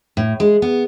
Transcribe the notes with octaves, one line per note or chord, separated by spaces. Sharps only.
A2
G#3
B3